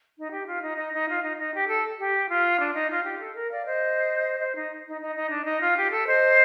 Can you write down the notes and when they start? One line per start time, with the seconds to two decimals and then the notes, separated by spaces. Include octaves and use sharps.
0.17 D#4
0.32 G4
0.47 F4
0.62 D#4
0.77 D#4
0.92 D#4
1.08 F4
1.22 D#4
1.38 D#4
1.54 G4
1.68 A4
1.99 G4
2.28 F4
2.59 D4
2.75 D#4
2.89 F4
3.04 G4
3.20 A4
3.34 A#4
3.50 D5 F5
3.65 C5 D#5
4.40 C5
4.55 D#4
4.86 D#4
5.01 D#4
5.16 D#4
5.30 D4
5.46 D#4
5.60 F4
5.76 G4
5.91 A4
6.06 C5 D#5